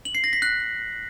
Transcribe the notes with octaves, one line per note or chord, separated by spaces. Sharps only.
F#7
C7
A#6
B6
F#6